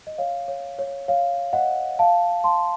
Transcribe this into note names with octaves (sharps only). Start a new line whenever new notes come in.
D#5
C#5 F5
C#5
C#5
C#5 F5
D#5 F#5
F5 A5
A5 C6